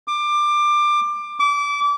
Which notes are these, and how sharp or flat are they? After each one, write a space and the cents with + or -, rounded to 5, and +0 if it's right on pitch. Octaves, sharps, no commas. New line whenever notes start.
D6 +20
D6 -25